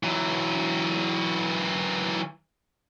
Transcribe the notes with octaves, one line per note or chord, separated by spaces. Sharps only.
E3 F#3